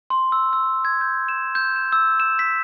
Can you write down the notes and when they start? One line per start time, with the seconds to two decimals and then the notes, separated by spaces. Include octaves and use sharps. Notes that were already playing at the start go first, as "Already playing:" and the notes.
0.10 C6
0.32 E6
0.53 E6
0.85 G#6
1.01 G6
1.28 E7
1.55 G6
1.76 E7
1.92 E6
2.20 E7
2.39 B6